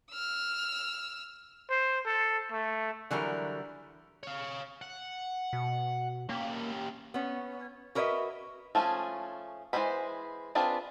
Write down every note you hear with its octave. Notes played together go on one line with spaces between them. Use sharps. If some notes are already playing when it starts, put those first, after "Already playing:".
E6 F6
C5
A4
A3
D3 E3 F#3 G3 A#4
C#5 F5
F#5
B2
A#3 C#4 G4
B3 C#4
F#4 A#4 B4 C#5 D#5 E5
F3 A3 C#4 F4 G#4
E3 F#3 G#3 C5 B5
C4 D4 F4 G#4 B4